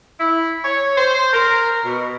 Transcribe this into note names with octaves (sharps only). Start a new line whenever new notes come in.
E4
C#5
C5
A#4
B2